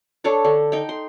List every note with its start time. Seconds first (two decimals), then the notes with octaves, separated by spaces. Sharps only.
0.24 D4 A4 C#5 D6
0.45 D3
0.72 D#4 G5
0.89 C6